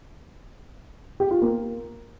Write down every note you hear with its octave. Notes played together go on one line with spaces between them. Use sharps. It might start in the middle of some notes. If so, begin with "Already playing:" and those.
G4
F4
A#3